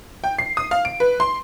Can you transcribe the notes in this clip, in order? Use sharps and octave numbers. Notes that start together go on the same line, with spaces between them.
G5
C7
D#6
F5
D7
B4
C6